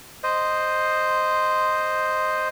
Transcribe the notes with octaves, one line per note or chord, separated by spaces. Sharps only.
C5 D#5